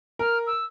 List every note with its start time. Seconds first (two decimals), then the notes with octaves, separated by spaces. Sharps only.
0.19 A#4 F6
0.47 E6